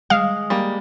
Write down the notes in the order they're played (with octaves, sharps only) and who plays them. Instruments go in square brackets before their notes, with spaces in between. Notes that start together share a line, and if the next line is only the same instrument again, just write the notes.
[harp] G#3 [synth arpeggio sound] F5
[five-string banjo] G3 A#3